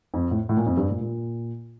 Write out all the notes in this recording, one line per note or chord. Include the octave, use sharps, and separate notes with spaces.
F2
A2
A2
A#2
F2
G2
A#2
A#2